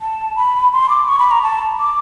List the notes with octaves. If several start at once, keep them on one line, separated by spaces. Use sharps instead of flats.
A5
B5
C6
D6
C#6
B5
A#5
A5
D6